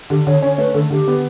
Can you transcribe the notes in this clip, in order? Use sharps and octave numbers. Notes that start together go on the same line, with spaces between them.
D3 G4
D3 C#5
C#4 C#5
A3 B4
D3 A4
D3 G4
B3